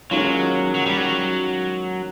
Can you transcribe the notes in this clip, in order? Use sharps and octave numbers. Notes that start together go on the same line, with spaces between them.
D#2 D#3 F#3 G#3 C#4 F4
F#3
G3
F#3